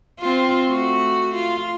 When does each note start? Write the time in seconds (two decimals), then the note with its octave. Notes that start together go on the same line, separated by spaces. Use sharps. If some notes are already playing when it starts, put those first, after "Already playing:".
0.19 C4 F4
0.68 A3 F#4
1.35 F4